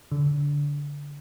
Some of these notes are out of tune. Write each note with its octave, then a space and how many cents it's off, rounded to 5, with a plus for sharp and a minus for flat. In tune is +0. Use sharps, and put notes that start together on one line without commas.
D3 -20